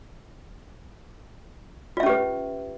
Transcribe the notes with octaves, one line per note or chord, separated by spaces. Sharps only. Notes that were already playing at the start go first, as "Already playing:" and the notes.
C#4 F4 G4 B4 E5